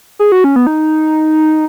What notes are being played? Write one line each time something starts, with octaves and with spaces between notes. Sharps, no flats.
G#4
F#4
C#4
B3
D#4